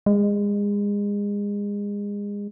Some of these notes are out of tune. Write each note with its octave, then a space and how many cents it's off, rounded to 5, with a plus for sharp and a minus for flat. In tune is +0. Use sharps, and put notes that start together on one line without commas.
G#3 -30